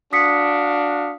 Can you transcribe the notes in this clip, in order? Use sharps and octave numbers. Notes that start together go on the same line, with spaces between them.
D4 F#4 F5 D#6 B6 C#7